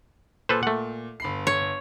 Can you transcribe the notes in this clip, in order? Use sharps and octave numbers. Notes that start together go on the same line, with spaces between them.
A#2 A4 B4 C5
A3 F#5
G1 B5 C7
C#5